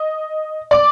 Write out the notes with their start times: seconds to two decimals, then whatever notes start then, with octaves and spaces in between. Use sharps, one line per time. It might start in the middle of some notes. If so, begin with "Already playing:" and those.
Already playing: D#5
0.71 D5 D6